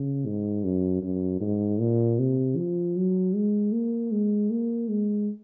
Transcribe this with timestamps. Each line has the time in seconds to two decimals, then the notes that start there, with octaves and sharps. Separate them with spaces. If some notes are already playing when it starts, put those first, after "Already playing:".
Already playing: C#3
0.26 G#2
0.64 F#2
1.03 F#2
1.41 G#2
1.80 A#2
2.19 C3
2.57 F3
2.96 F#3
3.35 G#3
3.73 A#3
4.12 G#3
4.51 A#3
4.89 G#3